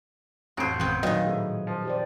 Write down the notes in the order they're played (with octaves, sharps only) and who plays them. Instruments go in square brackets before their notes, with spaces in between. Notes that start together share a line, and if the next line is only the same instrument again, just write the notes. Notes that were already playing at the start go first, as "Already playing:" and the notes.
[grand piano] A1 F2 D7 [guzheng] F#4 C5
[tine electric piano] G#1 G6 [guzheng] B3 C4
[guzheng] A#2 D#3 [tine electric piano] F#3 [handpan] B4 [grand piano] D#5 G5 D#6
[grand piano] A2 [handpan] C4 G#4
[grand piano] F3
[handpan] G4 C5 D5